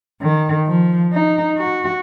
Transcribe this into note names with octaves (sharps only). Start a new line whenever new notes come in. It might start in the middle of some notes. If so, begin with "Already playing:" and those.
D#3
F3
D#4
F#4